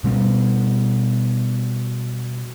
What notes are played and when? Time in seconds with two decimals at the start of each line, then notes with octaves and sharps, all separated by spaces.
0.04 B2 G3 A#3 B3